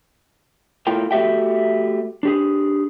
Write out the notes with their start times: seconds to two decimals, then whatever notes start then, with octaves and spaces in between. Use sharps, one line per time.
0.87 A3 E4 F4 A#4 G5
1.11 A3 F#4 G4 E5 G5
2.23 D4 G4 G#4